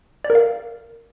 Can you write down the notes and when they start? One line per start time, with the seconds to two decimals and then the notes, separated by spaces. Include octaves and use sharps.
0.24 D5
0.30 A#4
0.35 F5